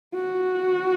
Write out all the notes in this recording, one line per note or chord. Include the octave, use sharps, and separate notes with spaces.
F#4